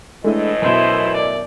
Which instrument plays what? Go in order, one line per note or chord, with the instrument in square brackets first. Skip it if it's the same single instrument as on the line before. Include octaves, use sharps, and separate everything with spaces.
[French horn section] A2 E3 D#5 [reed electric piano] G#3 D4 E4 [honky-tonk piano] A3
[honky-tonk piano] F#2 B2 [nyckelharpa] E4 C5 [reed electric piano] A#4 E5
[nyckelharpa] D5